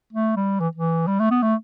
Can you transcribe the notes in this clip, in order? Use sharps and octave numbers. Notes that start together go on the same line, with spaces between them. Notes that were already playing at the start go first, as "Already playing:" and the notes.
A3
G3
E3
E3
G3
A3
B3
A3